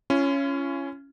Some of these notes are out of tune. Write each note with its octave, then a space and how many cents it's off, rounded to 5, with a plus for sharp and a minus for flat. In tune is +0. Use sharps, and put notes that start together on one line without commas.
C#4 +0 F4 -45